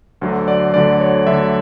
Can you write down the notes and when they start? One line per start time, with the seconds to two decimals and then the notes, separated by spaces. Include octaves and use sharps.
0.21 D2 D3 F#3
0.48 D5
0.73 D2 D3 F#3 D5
1.00 C#5
1.27 D2 D3 F#3 E5